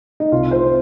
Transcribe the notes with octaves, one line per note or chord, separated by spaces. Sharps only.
D#4
C2 F4
C5